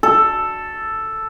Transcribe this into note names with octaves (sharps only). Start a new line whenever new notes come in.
A4